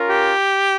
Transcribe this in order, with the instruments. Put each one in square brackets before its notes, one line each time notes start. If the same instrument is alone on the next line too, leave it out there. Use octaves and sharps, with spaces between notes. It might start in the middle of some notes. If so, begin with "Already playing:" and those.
Already playing: [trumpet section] C#4 F4 A#4
[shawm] G4